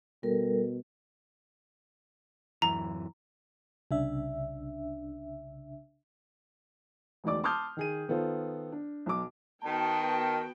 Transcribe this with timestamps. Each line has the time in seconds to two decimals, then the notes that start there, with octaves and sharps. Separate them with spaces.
0.23 B2 G3 A4 A#4
2.62 D1 F#2 E3 A#5
3.91 C2 C#3 D4 E5
7.24 E1 D2 D#4 D5 D6
7.44 A5 C6 D6 D#6 F6 G6
7.77 D#3 G#4 D#7
8.09 D#3 B3 F4 A4 C5
8.72 D4
9.06 B1 D6
9.65 D#3 B3 F#4 G5 A5